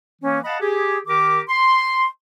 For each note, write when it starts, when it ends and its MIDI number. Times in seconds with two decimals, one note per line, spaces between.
0.22 0.39 52
0.22 0.39 58
0.22 0.39 61
0.45 0.56 75
0.45 0.56 77
0.45 0.56 78
0.45 0.56 81
0.45 0.56 83
0.60 0.98 67
0.60 0.98 68
1.07 1.41 51
1.07 1.41 67
1.07 1.41 70
1.07 1.41 86
1.49 2.06 84